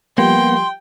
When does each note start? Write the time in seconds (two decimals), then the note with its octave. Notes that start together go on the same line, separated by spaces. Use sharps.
0.18 F3 G3 A#3 B3 G4 G5 C6